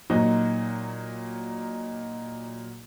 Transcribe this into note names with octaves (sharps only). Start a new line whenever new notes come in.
A#2 F#3 D#4 F#4